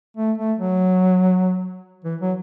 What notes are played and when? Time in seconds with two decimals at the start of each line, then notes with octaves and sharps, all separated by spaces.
0.17 A3
0.38 A3
0.58 F#3
2.04 E3
2.21 F#3